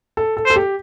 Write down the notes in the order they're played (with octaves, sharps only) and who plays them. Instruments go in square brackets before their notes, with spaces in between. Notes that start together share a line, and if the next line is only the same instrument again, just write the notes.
[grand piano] A4
A4
[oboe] C5
[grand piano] A4
G4